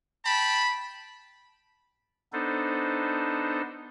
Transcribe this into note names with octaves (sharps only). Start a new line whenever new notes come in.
G5 A5 B5
B3 D4 D#4 A4 C5